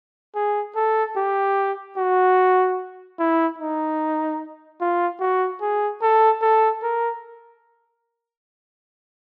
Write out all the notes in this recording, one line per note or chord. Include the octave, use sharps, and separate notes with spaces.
G#4
A4
G4
F#4
E4
D#4
F4
F#4
G#4
A4
A4
A#4